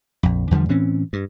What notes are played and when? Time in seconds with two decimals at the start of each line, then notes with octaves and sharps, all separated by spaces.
0.23 A#1 F2
0.51 E2 D3 F3 G3
0.69 A2 E3 C4 C#4
1.13 G2